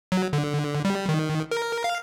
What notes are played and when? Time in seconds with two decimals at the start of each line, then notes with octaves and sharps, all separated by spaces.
0.12 F#3
0.33 D3
0.85 G3
1.09 D#3
1.51 A#4
1.84 F5